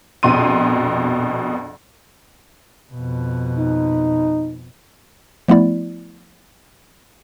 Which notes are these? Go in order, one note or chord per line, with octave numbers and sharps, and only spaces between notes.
A#1 F2 B2 C6 D#7
F2 B2
D#4
F3 A3 B3 E4 D5